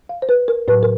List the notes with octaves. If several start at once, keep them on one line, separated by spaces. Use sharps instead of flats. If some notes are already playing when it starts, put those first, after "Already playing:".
F5
C5
B4
A#4
A2 F#3 B4
A#4